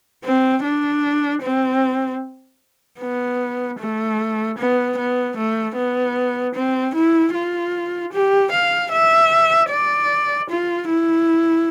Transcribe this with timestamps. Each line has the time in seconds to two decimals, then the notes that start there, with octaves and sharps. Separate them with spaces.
0.24 C4
0.64 D4
1.42 C4
3.00 B3
3.79 A3
4.58 B3
4.98 B3
5.37 A3
5.76 B3
6.55 C4
6.95 E4
7.34 F4
8.13 G4
8.52 F5
8.92 E5
9.70 D5
10.50 F4
10.88 E4